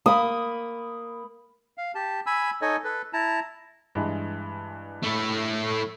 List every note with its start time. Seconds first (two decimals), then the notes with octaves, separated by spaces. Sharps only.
0.06 A#3 B5 D#6
1.78 F5
1.95 G4 A5
2.26 G#5 B5 E6
2.62 D#4 A4 C#5 D#5 G#5
2.84 A4 B4
3.13 E4 A5 A#5
3.95 G2 E3 G#3
5.04 A3 E4